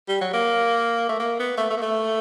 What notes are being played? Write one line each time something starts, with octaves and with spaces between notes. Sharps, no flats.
G3
F#3
A#3
A3
A#3
B3
A3
A3
A#3
A3